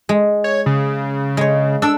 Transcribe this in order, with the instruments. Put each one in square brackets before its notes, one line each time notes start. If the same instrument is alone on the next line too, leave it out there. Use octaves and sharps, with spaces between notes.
[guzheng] G#3
[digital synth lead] C#5
C#3
[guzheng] G#3 C#5
[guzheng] D4 A4 D5 [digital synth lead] E6